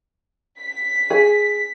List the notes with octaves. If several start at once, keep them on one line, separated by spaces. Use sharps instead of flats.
B6
G#4